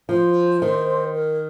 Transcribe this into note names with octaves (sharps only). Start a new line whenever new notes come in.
F3 C5
D#3
A#4